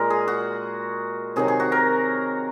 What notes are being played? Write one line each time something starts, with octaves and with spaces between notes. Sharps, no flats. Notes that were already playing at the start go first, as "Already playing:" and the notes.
Already playing: A#2 G#3 A#4
G#4
F#4
C3 D#3 F#3 G#4
G#4
F#4
A#4